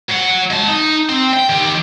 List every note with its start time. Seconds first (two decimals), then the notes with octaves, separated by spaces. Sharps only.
0.09 F#3 F#5
0.51 G#3 A5
0.68 D#4
1.09 C4
1.34 G5
1.50 D#3 G4